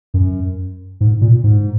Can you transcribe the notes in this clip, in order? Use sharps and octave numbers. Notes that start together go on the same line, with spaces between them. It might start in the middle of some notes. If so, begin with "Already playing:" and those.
F#2
G#2
A#2
G#2